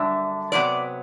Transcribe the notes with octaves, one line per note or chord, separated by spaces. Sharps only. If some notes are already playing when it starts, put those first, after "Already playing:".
Already playing: F#2 D3 G3 D4 E5
C3 F#3 B3 D5